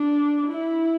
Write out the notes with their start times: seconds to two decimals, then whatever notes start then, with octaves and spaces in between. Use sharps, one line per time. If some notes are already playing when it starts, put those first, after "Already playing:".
Already playing: D4
0.49 E4